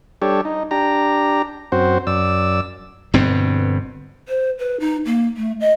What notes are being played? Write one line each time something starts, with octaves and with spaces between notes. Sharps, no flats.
G3 D4 G4 A4 C#5
D#4
D4 G4 A#5
F#2 C4 F#4 C5
F#2 D5 E6
G1 G2 B2 C4
C5
B4
D#4
A#3
A3
D#5